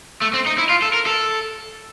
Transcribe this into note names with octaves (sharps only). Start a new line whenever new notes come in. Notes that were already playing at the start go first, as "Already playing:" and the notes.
A3
C4
D#4
E4
F4
A4
A#4
A4